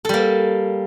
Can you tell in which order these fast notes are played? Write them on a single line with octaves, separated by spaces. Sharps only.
A4 G3 A#3